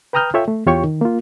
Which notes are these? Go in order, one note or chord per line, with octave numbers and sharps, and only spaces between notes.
B4 G5 A#5 D#6 F6 G6
F4 A4 C#5 E5 G5
A3
E2 F4 G4 C#5 G5 C#6
D#3
A#3 F4